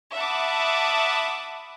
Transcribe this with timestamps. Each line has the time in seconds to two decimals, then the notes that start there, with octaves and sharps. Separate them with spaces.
0.14 E5 F#5 A5 B5 D6 D#6